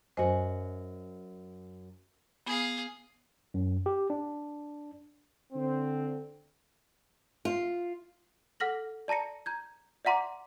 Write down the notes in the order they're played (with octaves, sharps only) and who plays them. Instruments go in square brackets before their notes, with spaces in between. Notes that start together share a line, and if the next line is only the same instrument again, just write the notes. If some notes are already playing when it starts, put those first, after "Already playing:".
[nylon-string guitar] F#2 F#4 [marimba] C5 D#5 G#5
[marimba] B3 [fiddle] G#4 F5
[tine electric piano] F#2
G4
D4
[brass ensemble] D3 C4
[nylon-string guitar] F4
[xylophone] A4 F#5 F6 A#6 F#7
D5 A5 A#5 A#6 C#7
A#5 G6 G#6
D5 E5 F#5 A#5 C6 D6